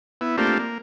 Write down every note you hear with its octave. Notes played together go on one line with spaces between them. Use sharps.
B3 E4
A3 A#3 C4 D4 F4 G4
A#3